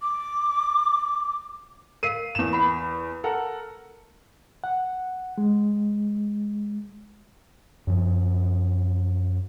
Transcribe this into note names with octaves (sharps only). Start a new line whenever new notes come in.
D6
A#4 F5 C7 D#7
E2 E7
F#5 B5
A4 A#4 F#5
F#5
G#3
F#2 F3